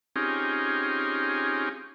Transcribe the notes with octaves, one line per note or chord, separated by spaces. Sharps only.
C4 C#4 D#4 F4 G4 G#4